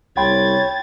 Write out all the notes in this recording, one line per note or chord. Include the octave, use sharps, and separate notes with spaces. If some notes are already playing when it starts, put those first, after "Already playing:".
C2 C#5 G5 B5 C6 G#6 A6